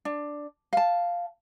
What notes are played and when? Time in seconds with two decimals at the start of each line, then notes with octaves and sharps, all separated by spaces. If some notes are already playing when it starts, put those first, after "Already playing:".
0.05 D4
0.73 F5 A5